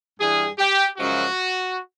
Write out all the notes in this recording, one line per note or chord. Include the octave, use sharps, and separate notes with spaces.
G2 E3 G3 G#4
G4
F#2 C#3 F3 G#3 F#4